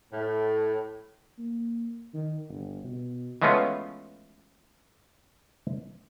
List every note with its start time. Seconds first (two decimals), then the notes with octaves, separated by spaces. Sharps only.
0.12 A2
1.38 A#3
2.14 D#3
2.48 G1
2.84 B2
3.42 E3 G#3 A3 B3 C#4 F4